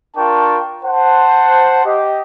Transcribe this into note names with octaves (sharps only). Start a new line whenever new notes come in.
D4 F4 A#4 G5 A5 C#6
C5 F#5 A5
G4 D#5